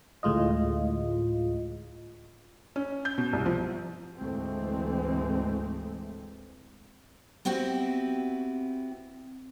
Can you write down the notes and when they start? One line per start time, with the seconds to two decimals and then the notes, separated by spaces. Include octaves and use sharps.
0.23 D2 A2 G#3 F4 D#5
2.76 C#4
3.05 G6
3.18 B2
3.33 C2
3.46 F3
4.19 D2 G#2 E3 G#3 A3 C4
7.45 B3 C4 E4 F#4 G4